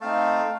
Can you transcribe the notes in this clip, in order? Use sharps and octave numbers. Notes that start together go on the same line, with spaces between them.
A3 C4 D#4 F5 A5
A3